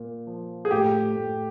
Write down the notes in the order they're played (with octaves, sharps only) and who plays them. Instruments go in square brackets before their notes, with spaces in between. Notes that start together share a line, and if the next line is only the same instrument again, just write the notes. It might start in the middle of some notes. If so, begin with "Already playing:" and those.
Already playing: [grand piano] A#2
F3
[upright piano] G#4
[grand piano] A2 [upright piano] G4
[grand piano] A2